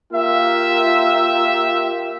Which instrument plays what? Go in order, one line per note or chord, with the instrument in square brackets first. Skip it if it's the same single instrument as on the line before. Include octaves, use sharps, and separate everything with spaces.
[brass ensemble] A#3 F4 G4 E5